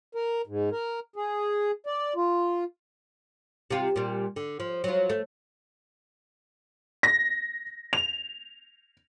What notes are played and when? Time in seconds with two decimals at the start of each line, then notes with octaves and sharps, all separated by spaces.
0.15 A#4
0.47 G#2
0.72 A#4
1.16 G#4
1.86 D5
2.16 F4
3.70 C3 F4
3.96 A#2 G3
4.36 D3
4.60 F3
4.84 F#3 F4
5.09 A3
7.03 A#6
7.93 F7